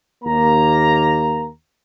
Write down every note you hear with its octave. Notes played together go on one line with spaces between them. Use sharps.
D#2 A#3 A#5